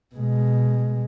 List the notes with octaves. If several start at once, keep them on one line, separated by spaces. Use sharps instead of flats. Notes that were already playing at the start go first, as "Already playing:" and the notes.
B2 G#3